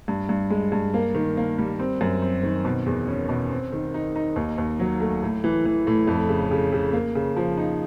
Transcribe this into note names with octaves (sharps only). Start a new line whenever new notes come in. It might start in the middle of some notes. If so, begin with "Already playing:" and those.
G2
G2
G#3
G2
A#3
D#3
A#3
G3
C4
F#2
C4
D#3
B2
E2
C#4
B2
C4
D#3
D#4
D#4
D#2
D#2
F#3
A3
A2
E3
E3
A2
F2
C#3
C#3
C#3
A#3
C#3
F3
D#4